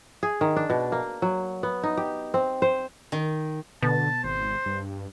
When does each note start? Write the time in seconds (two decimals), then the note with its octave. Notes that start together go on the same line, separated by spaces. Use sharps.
0.23 G#4
0.41 D#3
0.56 D4
0.70 B2
0.92 A#3
1.22 F#3
1.63 B3
1.83 D#4
1.97 G4
2.34 C4
2.62 C5
3.12 D#3
3.83 B2 D3 A5
4.24 G#1 C5
4.66 G2